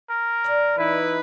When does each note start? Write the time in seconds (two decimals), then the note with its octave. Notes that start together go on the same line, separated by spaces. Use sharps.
0.10 A#4
0.44 A#2 D4 D5
0.78 E3 D#4 E4 B4